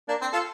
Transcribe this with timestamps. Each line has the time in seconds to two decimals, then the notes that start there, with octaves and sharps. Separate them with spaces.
0.08 A#3 D4
0.21 C4
0.33 F4 A4